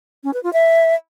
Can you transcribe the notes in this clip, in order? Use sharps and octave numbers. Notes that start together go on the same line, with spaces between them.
C#4
B4
F4
E5